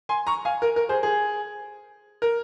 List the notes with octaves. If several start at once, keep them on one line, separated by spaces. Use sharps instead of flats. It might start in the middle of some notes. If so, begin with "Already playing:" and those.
G#5 C6
A#5 C#6
F5 G#5
A#4
A#4
G#4 C5
G#4
A#4